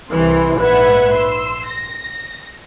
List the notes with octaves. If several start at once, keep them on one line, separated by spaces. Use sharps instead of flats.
C2 C3 E3 C6
A#1 G#2 B4 E5 F#5 G#6
C6 E6
A#6